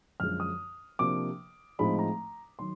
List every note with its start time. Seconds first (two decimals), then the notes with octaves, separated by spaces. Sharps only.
0.20 F#2 D3 F3 G#3 F6
0.40 D#6
0.99 C3 F3 A#3 D4 D6
1.79 A2 F3 G#3 C4 D#4 B5
1.99 A#5
2.59 D#3 F#3 C6